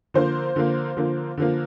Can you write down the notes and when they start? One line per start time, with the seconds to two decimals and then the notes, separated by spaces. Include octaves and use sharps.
0.14 D3 F3 A#3 C5
0.56 D3 F3 A#3
0.97 D3 F3 A#3
1.37 D3 F3 A#3